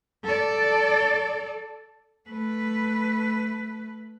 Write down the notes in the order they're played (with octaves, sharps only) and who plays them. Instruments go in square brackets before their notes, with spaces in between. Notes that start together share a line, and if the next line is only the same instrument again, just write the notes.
[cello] A4 D5
A3 B4